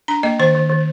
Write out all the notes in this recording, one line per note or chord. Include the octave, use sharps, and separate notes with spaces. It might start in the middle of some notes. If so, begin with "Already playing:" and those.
D4 A#5
A#3 D#5
D#3 C5
D#3
D#3